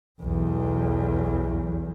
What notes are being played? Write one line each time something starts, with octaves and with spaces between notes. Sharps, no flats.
B1 E2